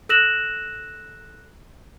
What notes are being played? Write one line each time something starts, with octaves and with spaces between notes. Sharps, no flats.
A4 E6 F#6 A#6 E7 F#7